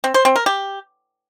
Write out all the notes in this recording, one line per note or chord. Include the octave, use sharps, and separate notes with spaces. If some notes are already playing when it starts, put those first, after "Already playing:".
C4
C5
C4
A#4
G4